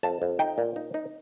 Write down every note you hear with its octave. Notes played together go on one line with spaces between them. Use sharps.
F2 A5
F2
D#4 G5
A#2
D#4
D#4